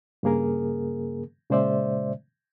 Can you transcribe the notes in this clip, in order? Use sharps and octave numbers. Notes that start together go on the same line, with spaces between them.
G2 C#3 A#3 G#4 A#4
A#2 C#3 G#3 C5 D5 E5